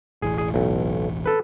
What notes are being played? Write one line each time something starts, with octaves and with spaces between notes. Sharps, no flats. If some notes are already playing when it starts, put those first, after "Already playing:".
E1 A1 E3 G#4
G#4
B1
A4 B4